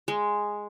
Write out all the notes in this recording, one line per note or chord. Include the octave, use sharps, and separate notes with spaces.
G#3